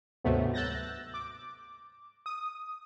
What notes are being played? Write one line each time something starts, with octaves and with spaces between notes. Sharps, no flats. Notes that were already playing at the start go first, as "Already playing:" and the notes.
D2 G#2 C3 F#3 A3 B3
E6 F#6 G6 A6 A#6
D6
D#6